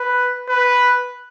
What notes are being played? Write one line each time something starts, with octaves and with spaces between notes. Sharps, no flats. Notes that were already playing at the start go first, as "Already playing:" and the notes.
Already playing: B4
B4